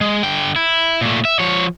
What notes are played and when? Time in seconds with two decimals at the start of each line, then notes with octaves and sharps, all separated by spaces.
0.01 G#3
0.23 D3 G5
0.56 E4
1.01 A#2 A3
1.25 E5
1.39 F3 C#5